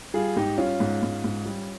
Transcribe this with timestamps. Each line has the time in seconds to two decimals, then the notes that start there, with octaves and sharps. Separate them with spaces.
0.14 G3 F4 G#4
0.36 G#2 D#4 G4
0.58 G3 C#4 F4
0.80 G#2
1.03 G#2
1.24 G#2
1.46 G3